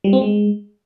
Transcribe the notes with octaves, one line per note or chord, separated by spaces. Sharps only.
G3
C4
G#3